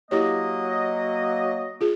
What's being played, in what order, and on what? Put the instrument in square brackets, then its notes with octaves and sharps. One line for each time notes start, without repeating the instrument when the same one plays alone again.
[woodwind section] F#3 A#3 D#5 [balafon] E4 G4 C#5
[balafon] F4 G#4